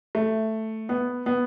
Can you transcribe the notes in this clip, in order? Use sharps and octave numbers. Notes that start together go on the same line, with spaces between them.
A3
B3
B3